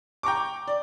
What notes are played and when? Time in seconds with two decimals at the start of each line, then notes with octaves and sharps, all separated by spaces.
0.23 G5 A#5 C#6 D6
0.68 D5